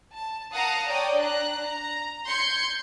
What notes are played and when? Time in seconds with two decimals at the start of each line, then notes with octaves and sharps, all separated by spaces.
0.13 A5
0.52 A#4 F5 F#5 A5 A#5 D#6
0.86 C#5 D5 G5 D#6
1.16 D4 A#5 F#6
1.63 A#5
2.26 C6 G6 G#6 C#7